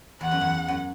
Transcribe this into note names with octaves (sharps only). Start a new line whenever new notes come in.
E2 F#5
F#2
E2
F#2